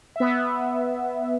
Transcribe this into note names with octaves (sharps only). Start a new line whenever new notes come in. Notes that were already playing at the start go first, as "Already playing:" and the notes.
B3 E5